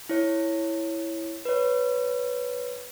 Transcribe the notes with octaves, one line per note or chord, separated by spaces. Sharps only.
E4 C#5
B4 C#5